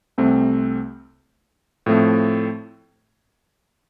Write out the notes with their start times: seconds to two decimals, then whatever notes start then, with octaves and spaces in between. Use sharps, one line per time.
0.18 C2 C3 A3 C4
1.86 A2 F3 A3 C4